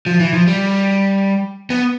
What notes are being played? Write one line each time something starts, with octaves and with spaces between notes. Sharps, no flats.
F3
E3
F3
G3
B3